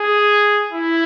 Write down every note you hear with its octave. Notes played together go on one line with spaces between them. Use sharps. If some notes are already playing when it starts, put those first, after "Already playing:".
Already playing: G#4
E4